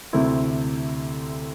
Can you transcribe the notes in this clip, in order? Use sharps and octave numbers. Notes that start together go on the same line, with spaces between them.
D2 C3 A3 C4 E4